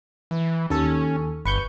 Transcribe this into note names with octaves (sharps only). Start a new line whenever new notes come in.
E3
D#2 C#4 A4
G1 B4 C#6 G6